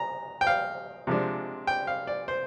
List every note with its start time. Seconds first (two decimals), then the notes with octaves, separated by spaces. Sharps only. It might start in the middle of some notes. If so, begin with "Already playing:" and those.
Already playing: A#5
0.41 G5
0.47 F5
1.07 C3 F3 G#3 D4
1.67 G5
1.87 F5
2.07 D5
2.28 C5